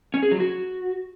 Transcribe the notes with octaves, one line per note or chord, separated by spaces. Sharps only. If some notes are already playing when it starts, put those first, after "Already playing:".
C#4
G#4
F#3
F#4